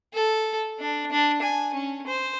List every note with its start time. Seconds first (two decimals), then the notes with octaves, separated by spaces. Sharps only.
0.13 A4
0.79 D4
1.11 D4
1.42 G#5
1.74 C#4
2.07 C5